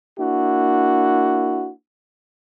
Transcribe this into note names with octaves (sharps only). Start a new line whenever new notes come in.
A#3 D4 E4 F#4